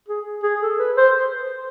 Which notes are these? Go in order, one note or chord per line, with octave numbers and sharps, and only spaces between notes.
G#4
G#4
A4
B4
C5